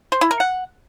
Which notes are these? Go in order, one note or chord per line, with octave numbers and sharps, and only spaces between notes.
C5
E4
A#4
F#5